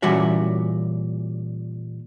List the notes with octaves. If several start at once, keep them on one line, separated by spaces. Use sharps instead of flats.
A#2 E3 G3 C#4 F#4 E5